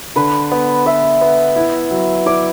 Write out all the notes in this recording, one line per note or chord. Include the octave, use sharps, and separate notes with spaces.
D3 B4
B3
B3 E5
B3
E4
F#3
E4 D5